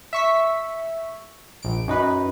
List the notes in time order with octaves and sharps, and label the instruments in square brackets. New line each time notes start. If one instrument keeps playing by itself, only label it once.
[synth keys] E5 C#6 B6
A#1 D7
F#2 D#4 B4